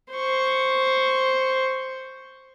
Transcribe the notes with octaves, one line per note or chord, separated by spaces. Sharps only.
C5 C#6